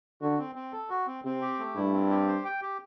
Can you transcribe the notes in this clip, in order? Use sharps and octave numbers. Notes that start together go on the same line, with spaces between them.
D3 F#4
C4
C4
A4
F#4
C4
C3 C4
G4
A3
G2 E4
C4
G4
C5
G5
G4